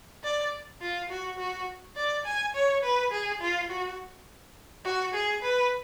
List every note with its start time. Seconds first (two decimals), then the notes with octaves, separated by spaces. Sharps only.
0.23 D5
0.82 F4
1.10 F#4
1.39 F#4
1.96 D5
2.25 G#5
2.55 C#5
2.83 B4
3.12 G#4
3.41 F4
3.70 F#4
4.85 F#4
5.14 G#4
5.43 B4